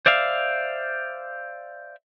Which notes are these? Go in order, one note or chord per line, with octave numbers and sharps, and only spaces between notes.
C5 D5 E5 F5